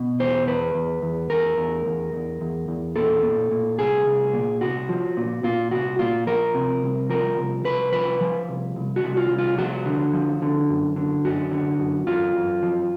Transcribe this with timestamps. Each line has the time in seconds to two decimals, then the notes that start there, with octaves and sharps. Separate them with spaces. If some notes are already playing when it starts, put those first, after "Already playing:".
Already playing: B2
0.19 E2 C5
0.47 E2 B4
0.75 E2
1.02 E2
1.30 E2 A#4
1.57 E2
1.86 E2
2.13 E2
2.41 E2
2.68 E2
2.96 A#2 A4
3.23 A#2
3.51 A#2
3.79 C2 G#4
4.06 C2
4.33 A#2
4.61 C2 F#4
4.89 F3
5.17 A#2
5.44 A#2 F4
5.71 C2 F#4
5.99 A#2 F4
6.27 F3 A#4
6.54 C3
6.83 C2
7.09 F3 A#4
7.38 C2
7.65 C2 B4
7.92 F3 B4
8.21 F3
8.49 C2
8.76 C2
8.96 F#4
9.04 C2
9.17 F4
9.31 C2
9.38 F4
9.58 F3 F#4
9.86 D3
10.13 F3
10.42 D3
10.70 F#2
10.96 D3
11.25 F#2 F#4
11.51 D3
11.79 F#2
12.07 F#2 F4
12.35 F#2
12.62 F3